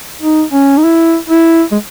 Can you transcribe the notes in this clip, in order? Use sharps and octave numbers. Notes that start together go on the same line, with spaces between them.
D#4
C#4
D#4
E4
E4
G#3